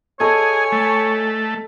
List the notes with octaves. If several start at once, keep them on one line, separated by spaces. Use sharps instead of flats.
G#4 A4 C#5 D#5 G#5
A3